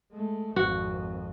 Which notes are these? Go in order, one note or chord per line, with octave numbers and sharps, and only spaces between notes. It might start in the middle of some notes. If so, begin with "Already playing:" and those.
G#3 A3
G#1 F2 F#4